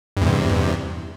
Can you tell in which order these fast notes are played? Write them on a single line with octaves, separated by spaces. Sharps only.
G2 E2 C3